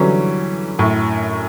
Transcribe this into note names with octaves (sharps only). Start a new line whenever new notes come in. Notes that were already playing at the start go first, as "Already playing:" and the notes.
Already playing: D3 E3 F#3 G3 C#4
F#2 A2